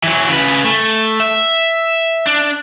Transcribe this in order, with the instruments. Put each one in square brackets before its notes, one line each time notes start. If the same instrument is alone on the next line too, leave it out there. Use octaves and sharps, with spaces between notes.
[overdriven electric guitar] E3 F#3
C#3 B4
A3
E5
D4